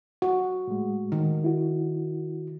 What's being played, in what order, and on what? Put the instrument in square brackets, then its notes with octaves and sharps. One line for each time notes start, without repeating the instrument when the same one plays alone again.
[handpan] F#4
[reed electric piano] A2 G#3
[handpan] D#3
[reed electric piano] E4 F#4